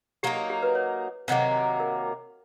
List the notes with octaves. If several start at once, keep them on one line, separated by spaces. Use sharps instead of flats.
F#3 A#3 D#4 G4
G4
G4
B4
C#5
C3 D#3 F#3 A#3 C5
A#4